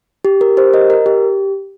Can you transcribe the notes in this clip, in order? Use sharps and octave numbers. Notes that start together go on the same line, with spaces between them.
G4
A#4
G4 C5
A#4 D#5
A#4
G4